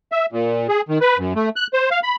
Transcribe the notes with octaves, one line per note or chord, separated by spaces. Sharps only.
E5
A#2
G#4
D#3
B4
F#2
A3
F#6
C5
F5
B5